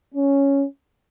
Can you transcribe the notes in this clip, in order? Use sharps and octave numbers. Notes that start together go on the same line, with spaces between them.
C#4